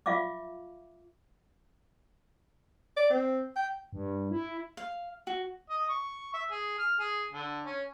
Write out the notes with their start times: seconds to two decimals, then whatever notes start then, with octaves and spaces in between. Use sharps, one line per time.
0.06 F4 E5 F5 C#6 D6
2.97 D5
3.10 C4
3.56 G5
3.93 G2
4.31 E4
4.77 F5
5.27 F#4
5.70 D#5
5.89 C#6
6.33 E5
6.51 G#4
6.79 F6
6.99 G#4
7.31 D3
7.65 C#4